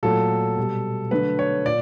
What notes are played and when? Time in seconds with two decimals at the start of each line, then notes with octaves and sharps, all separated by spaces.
0.03 A#2 F#3 A3 A4
0.57 B2 G3
1.11 D3 F#3 A3 B4
1.39 C#5
1.65 A#2 D5